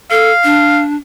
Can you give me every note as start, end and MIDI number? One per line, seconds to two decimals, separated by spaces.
0.11 0.31 69
0.11 0.80 77
0.44 0.96 62